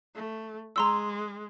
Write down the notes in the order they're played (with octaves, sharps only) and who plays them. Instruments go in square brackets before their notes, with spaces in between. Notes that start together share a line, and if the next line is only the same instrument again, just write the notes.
[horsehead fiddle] A3
[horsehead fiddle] G#3 [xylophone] A#5 C6 E6